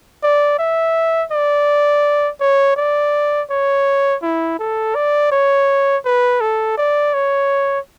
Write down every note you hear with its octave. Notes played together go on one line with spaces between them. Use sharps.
D5
E5
D5
C#5
D5
C#5
E4
A4
D5
C#5
B4
A4
D5
C#5